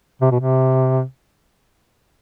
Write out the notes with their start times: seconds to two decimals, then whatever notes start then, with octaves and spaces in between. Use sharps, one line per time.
0.21 C3
0.31 B2
0.40 C3